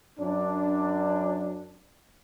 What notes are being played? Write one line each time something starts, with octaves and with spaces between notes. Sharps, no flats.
F#2 D4